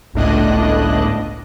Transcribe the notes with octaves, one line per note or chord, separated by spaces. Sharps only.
G1 C#2 A2 D4 D#5 F#6